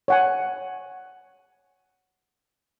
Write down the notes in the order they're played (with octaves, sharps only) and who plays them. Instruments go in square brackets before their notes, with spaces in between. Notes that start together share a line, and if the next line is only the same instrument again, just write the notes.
[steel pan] C#5 F#5 G#5